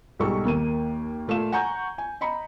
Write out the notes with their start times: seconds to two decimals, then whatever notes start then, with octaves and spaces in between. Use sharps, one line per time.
0.19 B1 G#2 G3 A4 C#6
0.45 D#2 A#3 D#7
1.28 A#2 A3 F5 E7
1.52 F#5 G#5 A#5 C#6 G6
1.98 G#5
2.21 D#5 A#5 B5 C#7